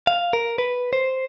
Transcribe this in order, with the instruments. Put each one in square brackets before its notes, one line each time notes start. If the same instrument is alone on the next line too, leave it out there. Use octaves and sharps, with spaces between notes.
[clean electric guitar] F5
A#4
B4
C5